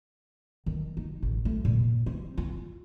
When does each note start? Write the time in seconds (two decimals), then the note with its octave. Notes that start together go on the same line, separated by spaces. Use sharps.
0.66 D#3
0.97 D#4
1.22 A1
1.45 A3
1.65 A#2
2.06 C4
2.37 F4